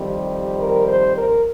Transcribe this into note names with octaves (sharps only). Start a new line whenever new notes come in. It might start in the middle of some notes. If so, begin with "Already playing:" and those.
Already playing: F2 D#3 G3 C4
G4
A#4
C5
A#4